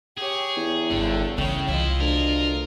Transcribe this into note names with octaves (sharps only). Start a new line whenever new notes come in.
G4 G#4 C#5
E2
G1 D3 A3 G5
C#3 E3 C#5 G5
C2 E4 F4 D#5
D2 A#4